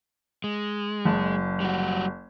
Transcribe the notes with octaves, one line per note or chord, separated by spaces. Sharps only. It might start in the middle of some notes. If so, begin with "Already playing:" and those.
G#3
F#1 A5
G3 F#4